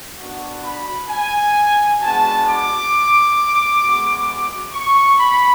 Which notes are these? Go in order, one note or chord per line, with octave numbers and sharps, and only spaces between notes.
B3 D4 F#4
B5
G#5
G#3 B3 D4 F#4 A5
D6
G#3 B3 F#4
C#6
B5